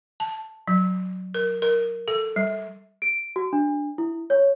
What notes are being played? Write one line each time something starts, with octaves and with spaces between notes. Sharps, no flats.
A5
F#3
A#4
A#4
A4
G3
D7
F#4
D4
E4
C#5